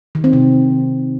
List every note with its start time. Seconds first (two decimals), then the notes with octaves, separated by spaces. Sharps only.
0.15 D#3
0.24 C4
0.33 C3